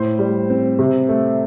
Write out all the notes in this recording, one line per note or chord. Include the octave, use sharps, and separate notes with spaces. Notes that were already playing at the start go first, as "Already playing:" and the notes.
Already playing: A2 C5
G3
C4
C3
A3